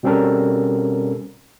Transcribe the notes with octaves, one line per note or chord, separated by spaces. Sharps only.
B2 G3 C4 C#4 A4 A#4